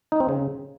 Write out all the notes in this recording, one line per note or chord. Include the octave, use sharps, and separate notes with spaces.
D#4
C4
C#3